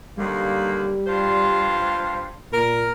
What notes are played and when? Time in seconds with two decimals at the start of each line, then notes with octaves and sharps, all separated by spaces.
0.18 D#2 D3 G3 A#3
1.07 G2 F4 C5
2.52 A#2 A#4